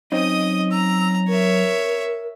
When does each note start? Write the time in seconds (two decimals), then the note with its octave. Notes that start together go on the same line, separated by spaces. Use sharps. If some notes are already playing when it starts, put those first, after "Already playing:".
0.12 F#3 C4 C#4 D#4 D#5 D#6
0.71 A#5 E6
1.28 A#4 C#5 E5